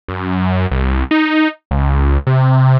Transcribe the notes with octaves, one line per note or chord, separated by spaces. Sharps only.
F#2
C2
D#4
C#2
C3